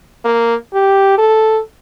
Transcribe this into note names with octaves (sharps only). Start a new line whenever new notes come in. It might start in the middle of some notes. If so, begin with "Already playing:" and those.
A#3
G4
A4